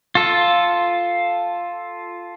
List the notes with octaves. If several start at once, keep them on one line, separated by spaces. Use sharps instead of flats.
F4 A4